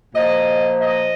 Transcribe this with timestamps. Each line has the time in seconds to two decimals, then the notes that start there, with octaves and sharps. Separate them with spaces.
0.14 A#2 F3 D#5
0.79 D#5